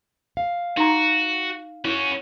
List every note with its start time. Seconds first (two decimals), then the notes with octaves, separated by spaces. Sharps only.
0.37 F5
0.77 D#4 F#4 A#5
1.85 C#4 E4 F#4